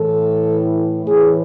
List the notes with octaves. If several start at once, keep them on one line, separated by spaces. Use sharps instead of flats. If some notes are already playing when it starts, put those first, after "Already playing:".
Already playing: A2 E3 A4
A2 E3 G#4